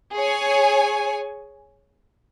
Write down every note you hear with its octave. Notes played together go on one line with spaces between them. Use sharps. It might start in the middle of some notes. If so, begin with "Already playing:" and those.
G#4 C#5 G#5